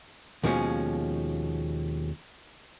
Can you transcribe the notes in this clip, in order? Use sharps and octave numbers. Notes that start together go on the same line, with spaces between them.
D#2 B2 F3 G#3 C#4